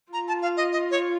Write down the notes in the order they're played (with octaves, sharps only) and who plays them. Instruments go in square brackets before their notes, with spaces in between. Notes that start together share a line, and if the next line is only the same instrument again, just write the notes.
[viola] F4 [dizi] A#5
[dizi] A5
F5
D#5
D#5
C#5